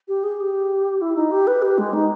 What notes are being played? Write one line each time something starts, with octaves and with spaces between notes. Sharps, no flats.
G4
G#4
G4
E4
D#4
G4
B4
G4
G#3
D#4